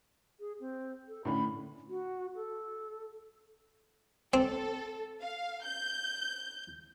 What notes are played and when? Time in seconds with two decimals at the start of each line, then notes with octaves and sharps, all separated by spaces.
0.40 G#4
0.60 C4
1.08 A4
1.25 A2 D3 C#4 B5
1.89 F#4
2.36 A4
4.34 C4 A4
5.21 F5
5.63 G6